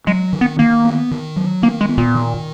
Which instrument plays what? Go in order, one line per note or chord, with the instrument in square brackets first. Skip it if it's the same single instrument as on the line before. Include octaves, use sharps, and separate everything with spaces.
[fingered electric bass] F#3 [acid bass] G#3
[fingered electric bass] D#3
[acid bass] B3
[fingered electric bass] D#3 [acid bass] A#3
[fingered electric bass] B3
D#3
F#3
[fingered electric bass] D#3 [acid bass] A#3
[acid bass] G#3
[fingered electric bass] B3
[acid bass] A#2
[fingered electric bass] D#3